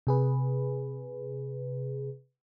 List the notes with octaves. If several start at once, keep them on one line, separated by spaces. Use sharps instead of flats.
C3 G#4 B4